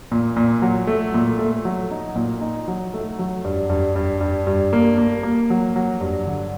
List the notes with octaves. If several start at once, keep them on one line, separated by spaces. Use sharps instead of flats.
A#2
A#2
F#3
A3
A#2
A3
F#3
D#4
A#2
D#4
F#3
A3
F#3
G2
G2
G2
G2
G2
A#3
A#3
A#3
F#3
F#3
G2
D3